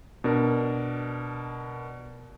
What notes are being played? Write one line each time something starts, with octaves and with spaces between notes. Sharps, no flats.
B2 D4 A#4